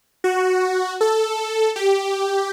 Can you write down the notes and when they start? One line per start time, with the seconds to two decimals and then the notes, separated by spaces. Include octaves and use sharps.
0.24 F#4
1.01 A4
1.76 G4